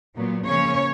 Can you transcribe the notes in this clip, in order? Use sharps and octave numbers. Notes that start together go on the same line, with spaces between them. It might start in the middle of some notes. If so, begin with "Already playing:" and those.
A#2 F#3 B3
C#3 F3 A#3 C#4 C#5